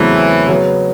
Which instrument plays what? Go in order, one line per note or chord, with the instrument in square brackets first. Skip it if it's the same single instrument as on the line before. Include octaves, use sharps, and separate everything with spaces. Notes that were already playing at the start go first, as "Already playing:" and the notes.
Already playing: [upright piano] E2 C#3 F#3 A3 C4 [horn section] E3
[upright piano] C#3 F#3 B3